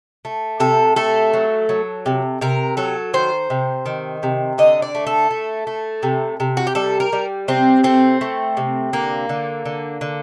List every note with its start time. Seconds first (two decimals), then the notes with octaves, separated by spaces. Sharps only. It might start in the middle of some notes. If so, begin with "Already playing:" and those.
0.25 A3
0.60 C3 A4
0.96 A3 A4
1.33 F#3
1.69 F#3
2.06 C3
2.41 C3 A#4
2.77 F#3 A4
3.14 D#3 C5
3.50 C3
3.86 D#3
4.23 C3
4.58 D3 D#5
4.82 D5
4.95 A3
5.07 A4
5.31 A3
5.67 A3
6.03 C3
6.40 C3
6.57 F#4
6.67 G4
6.75 G3 A4
7.00 A#4
7.12 G3
7.48 C3 C4
7.84 A3 C4
8.21 A3
8.57 C3
8.93 D3 A#3
9.29 D3
9.65 D3
10.01 D3